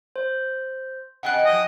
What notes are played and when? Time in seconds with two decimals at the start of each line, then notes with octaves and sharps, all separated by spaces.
0.16 C5
1.23 B2 D#5 F#5 G5 F#6
1.45 G#2 F3 D#5